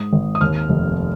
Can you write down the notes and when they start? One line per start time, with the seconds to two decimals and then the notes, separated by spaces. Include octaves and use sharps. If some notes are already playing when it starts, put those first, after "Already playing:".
Already playing: G#2 D#6
0.13 G#1
0.35 D#6
0.41 D#2 F6
0.69 F1